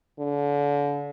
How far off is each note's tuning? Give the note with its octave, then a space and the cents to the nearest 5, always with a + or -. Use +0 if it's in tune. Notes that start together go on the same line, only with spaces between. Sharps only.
D3 -35